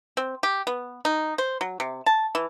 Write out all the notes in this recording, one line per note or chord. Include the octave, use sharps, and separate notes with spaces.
C4
G4
B3
D#4
C5
F#3
C3
A5
E3